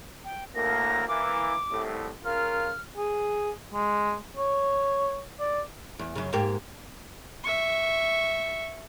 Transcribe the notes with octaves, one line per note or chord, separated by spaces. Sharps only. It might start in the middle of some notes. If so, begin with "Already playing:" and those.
G5
D2 A2 A#3 A#6
E3 A#3 D6
C2 A2
C#3 F4 A#4 F6
G#4
G#3
C#5
D5
E2
F#2 C#3
G#2 A#3 G4
E5 C#6